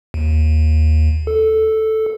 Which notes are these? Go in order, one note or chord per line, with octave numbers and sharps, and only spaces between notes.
D#2
A4